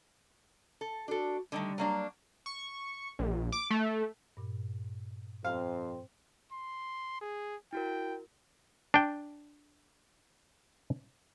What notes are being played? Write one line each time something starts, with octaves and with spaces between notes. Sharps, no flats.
A4
D4 F#4 A4
D3 D#3 G3 A3
F#3 A#3 D4
C#6
A#1
D6
A3
G2 A#2
F2 C4 F5
C6
G#4
E4 F#4 A#4 G5
D4 G5